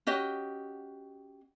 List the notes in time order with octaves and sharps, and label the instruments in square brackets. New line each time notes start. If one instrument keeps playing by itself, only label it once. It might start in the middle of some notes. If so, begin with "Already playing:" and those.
[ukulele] C#4 F#4 G4 D#5